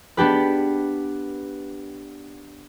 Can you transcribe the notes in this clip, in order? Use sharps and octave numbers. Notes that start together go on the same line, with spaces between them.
B3 D4 G4 B4